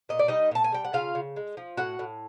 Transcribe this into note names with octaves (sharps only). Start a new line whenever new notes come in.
A#2 D#5
D5
G3 D#4 D#5
A#2 A5
G#5
G3 G5
F#5
C#3 F4 F5
C#3
G#3
F3
A2 F#4 F#5
A2